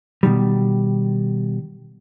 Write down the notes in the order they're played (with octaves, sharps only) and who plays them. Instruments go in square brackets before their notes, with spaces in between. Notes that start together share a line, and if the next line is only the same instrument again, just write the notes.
[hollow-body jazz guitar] B2 D#3 G3